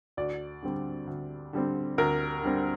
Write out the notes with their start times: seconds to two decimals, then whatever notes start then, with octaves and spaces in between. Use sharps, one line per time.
0.17 D2 D5
0.62 D3 G3 C4
1.07 D2
1.53 D3 G3 C4
1.98 D2 A#4
2.43 D3 G3 C4